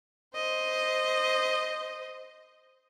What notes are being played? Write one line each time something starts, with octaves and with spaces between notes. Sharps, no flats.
C5 D#5